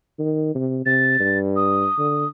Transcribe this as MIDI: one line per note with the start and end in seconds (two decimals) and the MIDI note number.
0.19 0.54 51
0.55 0.85 48
0.86 1.15 48
0.86 1.38 93
1.20 1.86 43
1.56 2.28 87
1.98 2.25 50